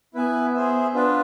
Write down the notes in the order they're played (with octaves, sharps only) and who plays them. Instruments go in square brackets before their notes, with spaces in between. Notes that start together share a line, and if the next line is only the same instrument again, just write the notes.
[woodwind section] B3 [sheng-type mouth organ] E4 B4 E5 G#5
[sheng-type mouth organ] G#4 C5 E5
[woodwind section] B3 [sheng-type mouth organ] D4 F4 B4